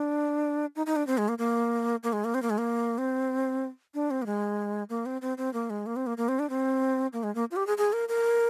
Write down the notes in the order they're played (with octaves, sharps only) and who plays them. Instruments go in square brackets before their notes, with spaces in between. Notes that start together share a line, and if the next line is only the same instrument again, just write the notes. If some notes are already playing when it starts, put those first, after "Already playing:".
Already playing: [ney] D4
D#4
D#4
D4
C4
G#3
A#3
A#3
A#3
G#3
A#3
C4
A#3
G#3
A#3
C4
D4
C4
A#3
G#3
A#3
C4
C4
C4
A#3
G#3
A#3
C4
A#3
A#3
C4
D4
C4
A#3
G#3
A#3
F4
G4
G#4
G#4
A#4
A#4